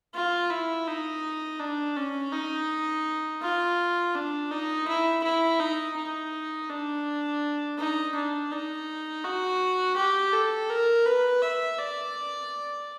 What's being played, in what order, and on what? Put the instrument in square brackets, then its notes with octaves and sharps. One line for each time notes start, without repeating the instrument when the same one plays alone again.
[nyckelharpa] F4
E4
D#4
D4
C#4
D#4
F4
D4
D#4
E4
E4
D#4
D#4
D4
D#4
D4
D#4
F#4
G4
A4
A#4
B4
E5
D5